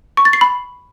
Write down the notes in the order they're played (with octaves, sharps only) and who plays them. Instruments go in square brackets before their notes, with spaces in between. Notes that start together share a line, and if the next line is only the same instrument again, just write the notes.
[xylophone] C#6
A6
C7
B5